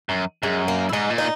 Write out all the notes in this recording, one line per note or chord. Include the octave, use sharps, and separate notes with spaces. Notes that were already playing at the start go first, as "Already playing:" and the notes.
F#2
F#2 G#3
A#3
E4
G#2 D#4
A#2
D#4